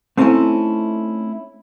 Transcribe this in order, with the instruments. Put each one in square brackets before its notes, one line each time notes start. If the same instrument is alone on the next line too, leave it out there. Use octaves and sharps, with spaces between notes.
[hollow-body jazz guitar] A3 C4 C#4 D#4 E4 A4